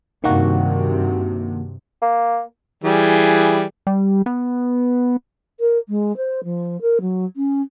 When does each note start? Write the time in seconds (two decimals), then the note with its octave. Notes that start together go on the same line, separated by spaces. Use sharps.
0.24 G2 C3 D#3 A#3 F#4
2.02 A#3
2.84 E3 G3 G#4
3.87 G3
4.26 B3
5.60 A#4
5.89 G#3
6.17 C5
6.44 F3
6.81 A#4
7.01 F#3
7.36 C#4